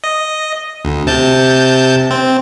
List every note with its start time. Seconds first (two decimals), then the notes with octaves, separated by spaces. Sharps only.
0.04 D#5
0.85 D2
1.07 C3 A5 G6
2.10 C4